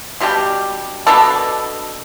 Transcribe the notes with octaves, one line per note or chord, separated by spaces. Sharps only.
B2 G3 D4 G4
B2 B3 D4 A4